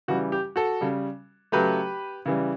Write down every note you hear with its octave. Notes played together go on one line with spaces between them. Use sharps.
C#3 E3 G3 F#4
G4
F#4 A4
C#3 G3
C#3 F#3 A3 G4 B4
C#3 E3 G3